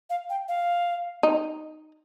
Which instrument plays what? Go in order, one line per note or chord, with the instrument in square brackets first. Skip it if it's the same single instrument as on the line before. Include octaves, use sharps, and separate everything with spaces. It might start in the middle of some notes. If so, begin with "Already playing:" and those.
[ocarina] F5
G5
F5
[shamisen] D#4